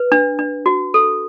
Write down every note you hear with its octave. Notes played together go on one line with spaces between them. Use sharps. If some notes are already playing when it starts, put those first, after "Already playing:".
Already playing: B4
D4
D4
F#4
A4